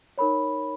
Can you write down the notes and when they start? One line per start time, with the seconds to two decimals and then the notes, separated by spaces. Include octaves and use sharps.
0.18 D#4 A#4 C#5 B5